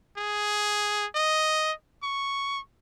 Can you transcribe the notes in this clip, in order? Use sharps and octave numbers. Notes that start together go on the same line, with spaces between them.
G#4
D#5
C#6